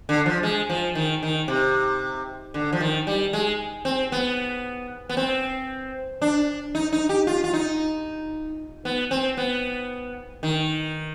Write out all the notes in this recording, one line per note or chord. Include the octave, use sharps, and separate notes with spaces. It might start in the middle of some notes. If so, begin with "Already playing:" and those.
D3
F3
G#3
F3
D#3
D#3
C3
D3
F3
D#3
G3
G#3
C4
B3
B3
C4
D4
D#4
D#4
G4
F4
F4
D#4
B3
C4
B3
D#3